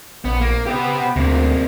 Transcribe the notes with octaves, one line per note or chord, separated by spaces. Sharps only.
A#1 B3
A#3
B3 G4 E5
D2 C3 A#3